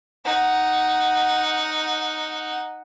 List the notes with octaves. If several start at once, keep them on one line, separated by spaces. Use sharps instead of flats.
D#4 F#5